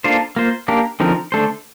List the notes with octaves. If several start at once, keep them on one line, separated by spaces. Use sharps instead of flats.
A#3 D4 F4 A4 C5
A#3 F4 C5
A#3 D4 G4 A#4
D3 F3 C4 D#4 A#4
D3 A3 D4 A4 C5